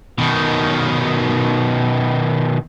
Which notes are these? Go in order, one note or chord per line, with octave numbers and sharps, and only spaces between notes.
B2 D#3